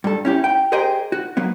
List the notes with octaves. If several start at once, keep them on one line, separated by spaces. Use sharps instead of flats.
G2 A4
C#4 E4 G4
G5
G4 G#4 A#4 C5 D#5 G5
F#4
F#3 A#3 B3